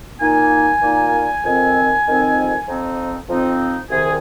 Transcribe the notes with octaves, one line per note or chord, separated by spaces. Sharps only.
A#2 A#3 D#4 G#5
A#2 A#3 D#4
F2 D#3 C4 G#5
F2 D#3 C4
F2 F3 C4 D#4
F2 F3 C4 D#4
C2 C3 D#3 G#4